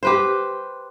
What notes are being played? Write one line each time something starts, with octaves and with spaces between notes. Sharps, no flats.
G4 B4 C5